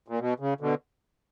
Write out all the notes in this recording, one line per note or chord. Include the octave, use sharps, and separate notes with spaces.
A#2
B2
C#3
B2 D3